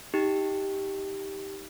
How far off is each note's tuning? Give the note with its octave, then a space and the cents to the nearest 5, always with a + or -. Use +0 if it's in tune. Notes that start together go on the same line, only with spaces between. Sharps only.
D#4 +20 G4 +0